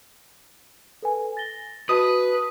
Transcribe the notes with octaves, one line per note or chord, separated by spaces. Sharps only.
A4 B4 G#5
A6 A#6 G7
F#4 B4 D#5 A5 D#6